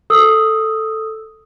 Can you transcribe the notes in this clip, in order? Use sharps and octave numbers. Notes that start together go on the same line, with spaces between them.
A4 D#6 E6